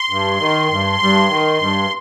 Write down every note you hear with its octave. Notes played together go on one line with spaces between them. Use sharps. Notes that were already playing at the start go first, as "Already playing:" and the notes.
Already playing: C6
G2
D#3
G2
G2
D#3
G2